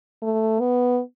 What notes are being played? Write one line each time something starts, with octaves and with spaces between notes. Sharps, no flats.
A3
B3